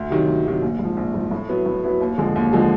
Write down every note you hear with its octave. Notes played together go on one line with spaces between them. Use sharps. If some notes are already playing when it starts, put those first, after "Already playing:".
Already playing: D2
C3 D#3 F#3
D2
C3 D#3 F#3
A#1
G#2 F3
A#1
G#2 F3
A2
F#3 B3 E4
A2
F#3 B3 E4
D#2
D3 F3 G#3
D#2
D3 F3 G#3